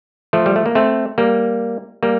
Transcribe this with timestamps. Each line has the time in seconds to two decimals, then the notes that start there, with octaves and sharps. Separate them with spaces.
0.33 F3 A3
0.46 G3
0.56 A3
0.66 A#3
0.75 A3 C4
1.18 G3 A#3
2.03 G3 A#3